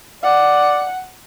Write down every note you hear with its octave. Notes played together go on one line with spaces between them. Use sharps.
D5 F#5